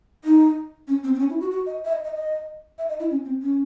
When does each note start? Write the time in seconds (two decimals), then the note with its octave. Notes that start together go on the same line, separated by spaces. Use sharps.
0.24 D#4
0.88 C#4
1.04 C4
1.15 C4
1.19 C#4
1.30 E4
1.40 F#4
1.51 F#4
1.66 D#5
1.85 E5
1.93 D#5
2.04 D#5
2.14 D#5
2.78 E5
2.89 D#5
3.00 E4
3.10 C#4
3.25 C4
3.42 C#4